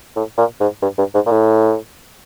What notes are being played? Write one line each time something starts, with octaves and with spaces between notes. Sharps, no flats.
A2
A#2
G#2
G2
G2
G#2
A#2
A2